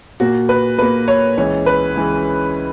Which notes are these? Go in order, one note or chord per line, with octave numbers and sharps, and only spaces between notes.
A#2 A#3 F#4
B4
A#2 A#3 B4
C#5
C#2 C#3 E3 C#5
B4
C#2 C#3 E3